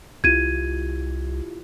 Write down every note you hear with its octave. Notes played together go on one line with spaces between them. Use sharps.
C2 E4 F4 G4 G#6 D#7